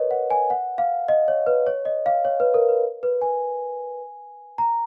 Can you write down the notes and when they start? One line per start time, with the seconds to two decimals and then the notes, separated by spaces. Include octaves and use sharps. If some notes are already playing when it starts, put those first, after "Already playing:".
Already playing: A#4 B4 C#5 D#5
0.11 F#5
0.30 G#5
0.50 F#5
0.78 F5
1.08 D#5
1.28 C#5
1.46 B4
1.67 C#5
1.85 D#5
2.06 F5
2.25 C#5
2.40 B4
2.54 A#4
2.69 B4
3.03 B4
3.21 G#5
4.58 A#5